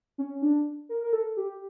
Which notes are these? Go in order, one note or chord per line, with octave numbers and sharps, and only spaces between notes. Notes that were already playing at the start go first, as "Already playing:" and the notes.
C#4
D4
A#4
A#4
A4
G4